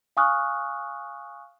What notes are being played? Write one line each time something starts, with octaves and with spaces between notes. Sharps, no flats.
F5 G#5 C#6 D#6 F6 F#6